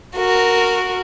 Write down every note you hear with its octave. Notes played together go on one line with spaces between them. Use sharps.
F#4 A#4